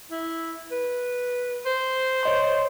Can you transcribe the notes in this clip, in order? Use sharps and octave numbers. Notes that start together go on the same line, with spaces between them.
E4
B4
C5
C#5 D#5 C6